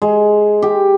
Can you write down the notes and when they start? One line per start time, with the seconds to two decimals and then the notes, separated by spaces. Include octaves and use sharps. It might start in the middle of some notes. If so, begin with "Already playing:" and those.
0.02 G#3
0.62 G4